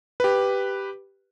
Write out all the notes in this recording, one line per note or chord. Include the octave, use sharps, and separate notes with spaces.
G4 B4